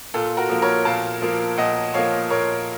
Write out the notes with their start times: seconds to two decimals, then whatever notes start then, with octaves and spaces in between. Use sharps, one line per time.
0.14 A#2 F4 A4
0.37 F#4 A#4
0.49 F3 A#3
0.62 A#4 C#5
0.85 A#2 F5 A5
1.22 F3 A#3
1.58 A#2 D#5 F#5
1.94 F3 A#3 C#5 F5
2.30 A#2 A#4 C#5